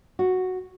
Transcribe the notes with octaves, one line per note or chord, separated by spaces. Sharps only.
F#4